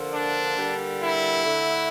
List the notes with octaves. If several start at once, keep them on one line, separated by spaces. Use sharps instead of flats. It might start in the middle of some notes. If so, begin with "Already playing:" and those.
Already playing: D3 F3 A#3
D4
D3 G3 A#3
E4
D3 A3